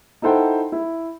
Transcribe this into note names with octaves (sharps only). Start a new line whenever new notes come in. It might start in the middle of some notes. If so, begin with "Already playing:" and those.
D#4 E4 A4 C5 F#5 G5
E4